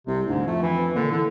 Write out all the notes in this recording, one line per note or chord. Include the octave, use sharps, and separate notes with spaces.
C2 C3
D2 G#2
F2 A3
E3
A#2 D3
D3 E3